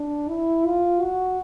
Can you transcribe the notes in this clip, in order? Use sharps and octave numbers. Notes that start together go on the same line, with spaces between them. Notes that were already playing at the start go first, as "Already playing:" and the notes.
Already playing: D4
E4
F4
F#4